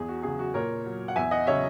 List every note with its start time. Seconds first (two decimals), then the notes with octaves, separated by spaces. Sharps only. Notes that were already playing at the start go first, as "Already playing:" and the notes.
Already playing: E2 G#4
0.09 F#4
0.23 C#3 F#3 G#4
0.39 F#4
0.54 A#2 A#4 C#5
0.86 F#3
1.08 F#5
1.16 E2 E5 G#5
1.31 D#5 F#5
1.47 C#3 F#3 C#5 E5